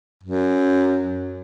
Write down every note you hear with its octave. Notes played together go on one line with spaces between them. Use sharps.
F#2